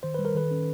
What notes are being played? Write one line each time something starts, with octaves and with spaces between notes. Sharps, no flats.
D#3 C5
G3 B4
A#4
D#3 A4 B4
C#4